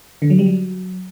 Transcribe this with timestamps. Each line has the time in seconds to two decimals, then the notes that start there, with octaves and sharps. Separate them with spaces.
0.22 D3
0.30 F#3
0.39 G3
0.46 F#3